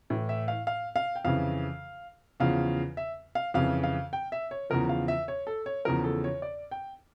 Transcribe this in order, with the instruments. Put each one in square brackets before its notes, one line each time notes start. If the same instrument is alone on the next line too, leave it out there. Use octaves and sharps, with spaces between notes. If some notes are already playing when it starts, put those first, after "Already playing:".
[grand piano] A2 E3
E5
F5
F5
F5
G5
F2 C#3 E3 F5
E2 C#3 F3 F5
E5
F5
F2 C#3 E3 F5
F5
G5
E5
C#5
E2 C#3 F3 A#4
F5
E5
C#5
A4
C#5
E2 C#3 F3 A#4
A4
C#5
D5
G5